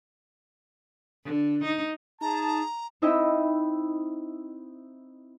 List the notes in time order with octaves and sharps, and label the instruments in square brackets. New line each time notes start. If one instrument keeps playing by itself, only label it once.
[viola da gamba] D3
D#4
[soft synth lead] D#4 [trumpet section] G#4 A5 [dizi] A#5
[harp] C4 D#4 E4 D#5 G5 B5